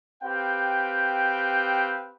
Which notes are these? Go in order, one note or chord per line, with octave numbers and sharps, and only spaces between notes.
C4 G4 B4 F5 G5